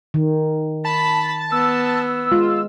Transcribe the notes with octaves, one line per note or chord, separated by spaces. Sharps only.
D#3
A5 B5
B3 E6
G#3 F4